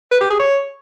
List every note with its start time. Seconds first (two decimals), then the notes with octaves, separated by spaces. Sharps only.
0.11 B4
0.21 G4
0.30 G#4
0.39 C#5